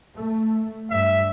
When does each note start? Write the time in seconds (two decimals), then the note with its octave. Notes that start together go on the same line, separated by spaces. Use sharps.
0.15 A3
0.90 G2 E5